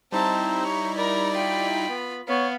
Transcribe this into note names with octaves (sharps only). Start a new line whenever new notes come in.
G3 C4 D#4 E4 C5 A5 A#5
C#5
A#4 D5 A#5 B5
F4 G5 B5
B3
B3 C#5 F5